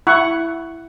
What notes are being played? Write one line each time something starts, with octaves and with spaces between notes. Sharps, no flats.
E4 F#5 C#6